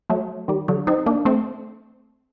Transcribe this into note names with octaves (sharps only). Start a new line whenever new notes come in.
F#3 A3
D#3 G3
D3 F#3
C4 D#4
A#3 D4
A3 C4